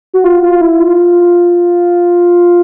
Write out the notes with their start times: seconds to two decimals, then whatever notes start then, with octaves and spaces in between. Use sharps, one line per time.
0.14 F#4
0.24 F4
0.43 F4
0.61 E4
0.80 F4